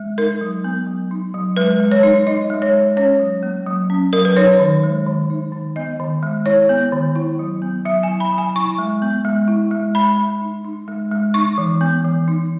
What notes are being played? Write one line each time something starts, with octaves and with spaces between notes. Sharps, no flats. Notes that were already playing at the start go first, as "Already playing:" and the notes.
Already playing: G#3
D#4 A#4
F#3
B3
F#3
D#4
F#3
G#3 B4
G#3
C#5
D#4
D#4 D#5
G#3
C#5
G#3
C#4 C#5
F#3
A#3
F#3
C#4
F#3 A#4
B4
D#4 C#5
D#3
G#3
D#3
D#4
D#3
B3 D#5
D#3
G#3
E4 C#5
B3
D#3
E4
F#3
B3
F#3 E5
E4 G#5
B5
F#3
G#5
E4 C#6
G#3
B3
G#3
E4
G#3
G#3 B5
G#3
D#4
D#4
G#3
G#3
D#4 C#6
E3
B3
E3
D#4